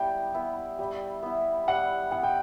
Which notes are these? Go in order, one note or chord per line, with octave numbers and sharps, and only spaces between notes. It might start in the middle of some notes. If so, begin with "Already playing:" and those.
Already playing: G3 B3 E4 G5
B3 E4
G3
B3 E4
G3 F#5
B3 E4 F#5
G5